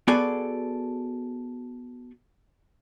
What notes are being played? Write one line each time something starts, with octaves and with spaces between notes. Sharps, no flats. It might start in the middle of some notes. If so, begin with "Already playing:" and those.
B3 F#4 G#4 A4 D5 G#5